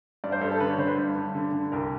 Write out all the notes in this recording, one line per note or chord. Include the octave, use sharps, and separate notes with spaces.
G2 D5
C5
G2 A4
A4
D3 B4
C#5
D3 C5
B4
G2
G2
D3
D3
C2 A#4